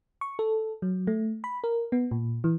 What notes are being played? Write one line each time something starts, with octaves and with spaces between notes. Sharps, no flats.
C#6
A4
F#3
A3
B5
A#4
B3
A#2
E3